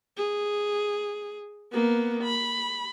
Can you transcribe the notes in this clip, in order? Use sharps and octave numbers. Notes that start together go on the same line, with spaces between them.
G#4
A#3 B3
B5